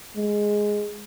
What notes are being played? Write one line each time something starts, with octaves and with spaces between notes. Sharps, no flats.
G#3